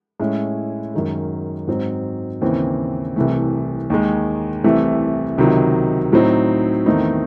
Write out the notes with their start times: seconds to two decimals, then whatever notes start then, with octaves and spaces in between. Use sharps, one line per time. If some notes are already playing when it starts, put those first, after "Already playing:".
0.20 A2 G#3 C#4 E4
0.94 F#2 D#3 G#3
1.67 G#2 F#3 C4
2.41 D#2 C#3 E3 C4
3.16 C2 C3 E3 A3
3.90 D#2 D#3 G#3
4.64 C2 C3 E3 A3
5.38 C#2 C3 D#3 F#3
6.12 A2 F#3 C4 D#4
6.86 E2 D#3 A3 C4 D#4